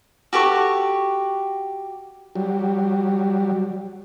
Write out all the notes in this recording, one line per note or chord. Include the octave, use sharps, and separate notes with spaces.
F#4 G4 A4 C#6
F#3 G3